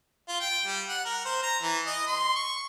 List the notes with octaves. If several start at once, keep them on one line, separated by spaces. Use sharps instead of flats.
F4
G5
G3
F#5
A#4
C5
A#5
E3
D#5
C6
C#6